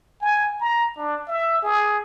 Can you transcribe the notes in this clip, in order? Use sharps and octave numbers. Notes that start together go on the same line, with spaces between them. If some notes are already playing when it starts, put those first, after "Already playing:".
G#5
A#5
D4
E5
G#4